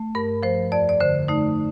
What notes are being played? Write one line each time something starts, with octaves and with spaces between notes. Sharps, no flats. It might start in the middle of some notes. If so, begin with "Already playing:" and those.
Already playing: A3
G2 A#4
F3 C5
F2 D5
D5
D3 C5
A3 D#4